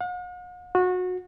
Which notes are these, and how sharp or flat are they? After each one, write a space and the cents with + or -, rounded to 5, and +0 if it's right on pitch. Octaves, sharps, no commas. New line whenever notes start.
F#5 -45
F#4 -25